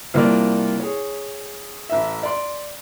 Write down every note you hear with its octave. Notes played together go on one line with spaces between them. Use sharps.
C2 F3 A#3 F4 D5
G#4 C#5
A1 E5
D5 C6